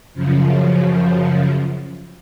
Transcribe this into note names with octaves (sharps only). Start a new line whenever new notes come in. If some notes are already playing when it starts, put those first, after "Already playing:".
F#2 C#3 F3